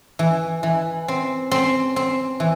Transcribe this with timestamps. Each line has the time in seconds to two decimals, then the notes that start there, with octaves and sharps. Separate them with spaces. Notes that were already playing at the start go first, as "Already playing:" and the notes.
0.19 E3
0.63 E3
1.08 C4
1.51 C4
1.96 C4
2.40 E3